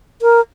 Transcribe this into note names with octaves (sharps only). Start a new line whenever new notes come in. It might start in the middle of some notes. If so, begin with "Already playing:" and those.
A#4